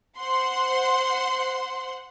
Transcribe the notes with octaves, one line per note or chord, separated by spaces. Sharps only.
C5 F#5 C6